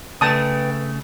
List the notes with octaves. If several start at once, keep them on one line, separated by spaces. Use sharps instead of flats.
C#3 A3 B4 G5 A5 D#6